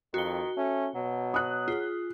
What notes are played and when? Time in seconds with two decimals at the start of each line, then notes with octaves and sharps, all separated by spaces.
0.14 F2 D#3 F#4 G7
0.57 A3 C#4
0.95 B2 F#3
1.34 D#6 F#6
1.68 F4 G#4